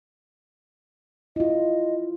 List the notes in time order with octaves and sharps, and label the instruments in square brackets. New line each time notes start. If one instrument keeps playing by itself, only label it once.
[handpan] E4 F4 [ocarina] D#5